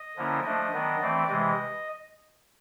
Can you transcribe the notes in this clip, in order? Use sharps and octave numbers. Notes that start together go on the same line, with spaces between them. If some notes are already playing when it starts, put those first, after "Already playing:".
Already playing: D#5
D3 F3 A#3 C#4 E4
F3 A3 D4 D#5
D#3 F#3 B3 D4
E3 A3 C4 D5
C3 E3 G#3 D#5